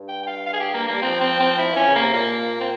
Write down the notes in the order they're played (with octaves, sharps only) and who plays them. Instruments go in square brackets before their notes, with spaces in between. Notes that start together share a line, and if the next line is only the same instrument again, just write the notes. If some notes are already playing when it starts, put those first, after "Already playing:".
Already playing: [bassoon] G2
[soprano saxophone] G5
G5
F5
F5
G#4
G4
A#3
[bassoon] G3 [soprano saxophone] A#3
[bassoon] F3 [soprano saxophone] C4
[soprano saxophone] C4
C4
E4
[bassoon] E3 [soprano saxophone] C#4
[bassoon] C#3
[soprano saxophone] A#3
[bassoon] C3
[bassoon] A#2 [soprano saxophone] A#3
[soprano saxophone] C4